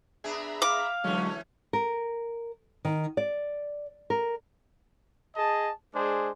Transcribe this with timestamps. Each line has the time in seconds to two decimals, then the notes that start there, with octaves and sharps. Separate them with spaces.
0.24 B3 D4 G#4 E5 A#5 B5
0.62 F5 D6
1.04 D3 E3 F#3 G#3 A3 C#4
1.73 A#4
2.85 D#3
3.17 D5
4.10 A#4
5.36 G#4 D#5 A5
5.95 G#3 D4 G#4 C5